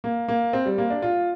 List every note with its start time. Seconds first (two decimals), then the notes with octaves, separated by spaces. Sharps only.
0.04 A#3
0.28 A#3
0.53 C4
0.65 G3
0.78 A#3
0.90 D4
1.02 F4